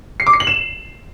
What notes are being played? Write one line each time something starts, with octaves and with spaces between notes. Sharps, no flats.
C7
D6
C7
F#7
E7